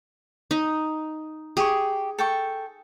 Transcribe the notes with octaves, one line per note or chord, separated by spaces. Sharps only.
D#4
G4 G#4 C#6
A4 G5 C#6